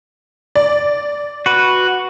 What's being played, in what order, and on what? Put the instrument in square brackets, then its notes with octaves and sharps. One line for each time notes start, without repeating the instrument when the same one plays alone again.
[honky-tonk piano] D5
[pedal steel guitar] F#4 B4